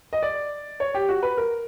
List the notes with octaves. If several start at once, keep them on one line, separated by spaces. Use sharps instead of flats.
D#5
D5
C#5
G4
F#4
B4
A#4